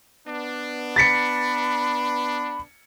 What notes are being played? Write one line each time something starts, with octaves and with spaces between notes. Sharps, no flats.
B3 D4
B5 A6 B6 C#7